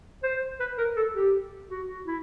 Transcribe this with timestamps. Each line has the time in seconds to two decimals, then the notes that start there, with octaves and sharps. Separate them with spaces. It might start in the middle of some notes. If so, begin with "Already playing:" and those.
0.23 C5
0.60 B4
0.78 A#4
0.96 A4
1.15 G4
1.70 F#4
2.07 E4